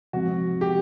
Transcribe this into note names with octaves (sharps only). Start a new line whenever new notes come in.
C3 F3 G#3 C4 F#4
G4